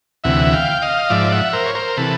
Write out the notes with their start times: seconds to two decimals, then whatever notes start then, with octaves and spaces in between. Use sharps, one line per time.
0.24 D2 C3 E3 E5 F#5
0.53 F5 G5
0.82 D#5 F5
1.10 G#2 F3 D5 E5
1.32 E5 F#5
1.53 A#4 C5
1.66 C#5
1.75 A#4 C5
1.97 C3 E3 A4 B4